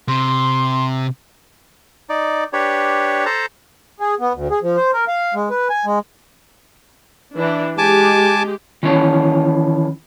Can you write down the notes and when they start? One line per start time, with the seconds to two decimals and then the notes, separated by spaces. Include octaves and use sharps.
0.08 C3 C6
2.09 D#4 D5
2.53 D4 G4 B4 C#5
3.26 A4 C5 A5 A#5
4.00 G#4
4.20 B3
4.35 D2
4.51 G#4
4.62 F3
4.77 C5
4.93 A#4
5.08 F5
5.34 G#3
5.50 B4
5.70 G#5
5.85 G#3
7.36 E3 D4 E4
7.78 G#3 G4 G#5 A5 D6
8.83 D#3 E3 C#4 C#5